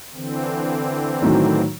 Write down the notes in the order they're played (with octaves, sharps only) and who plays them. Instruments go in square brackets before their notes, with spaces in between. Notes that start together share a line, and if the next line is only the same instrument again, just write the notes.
[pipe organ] D3 E3 C4
[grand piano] A2 D#3 F#3